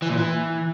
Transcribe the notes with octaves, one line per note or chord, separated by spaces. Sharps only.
E3
A#2
E3